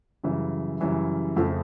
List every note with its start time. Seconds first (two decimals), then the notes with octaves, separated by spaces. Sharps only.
0.24 F#2 C#3 E3 G3
0.80 F#2 C#3 E3 G3
1.36 F2 C#3 F3 A3